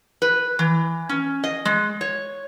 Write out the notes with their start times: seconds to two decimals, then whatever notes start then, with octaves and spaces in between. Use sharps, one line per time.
0.22 B4
0.59 E3
1.09 C#4
1.44 D#5
1.65 G#3
2.01 C#5